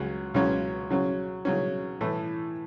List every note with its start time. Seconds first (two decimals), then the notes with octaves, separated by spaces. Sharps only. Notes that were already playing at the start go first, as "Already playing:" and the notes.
Already playing: C#2 C#3 F#3 C#4
0.34 C#2 C#3 F#3 C#4
0.90 C#3 F#3 C#4
1.45 C#3 F#3 C#4
2.01 A2 E3 A3